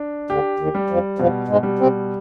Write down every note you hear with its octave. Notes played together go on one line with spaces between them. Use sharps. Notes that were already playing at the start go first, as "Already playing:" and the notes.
Already playing: D4
D2 D3 G4
D#2 D#3
G3
F2 F3
F2 B2 F3
G#2 G#3
G3
C3 C4